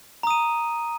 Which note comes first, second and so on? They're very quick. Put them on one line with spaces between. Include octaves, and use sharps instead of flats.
A#5 D#6 D#7